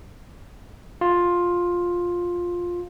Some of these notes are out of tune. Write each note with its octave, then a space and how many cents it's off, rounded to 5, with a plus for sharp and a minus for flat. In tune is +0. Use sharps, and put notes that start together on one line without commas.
F4 +10